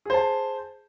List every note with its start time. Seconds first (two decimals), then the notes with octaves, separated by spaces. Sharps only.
0.06 G#4
0.10 C5
0.14 A5